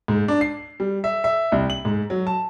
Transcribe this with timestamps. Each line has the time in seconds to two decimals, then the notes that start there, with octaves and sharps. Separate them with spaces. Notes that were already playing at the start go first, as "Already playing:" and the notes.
0.08 G#2
0.28 D4
0.41 C7
0.80 G3
1.04 E5
1.24 E5
1.52 C2
1.70 F#7
1.85 G#2
2.10 F#3
2.27 A5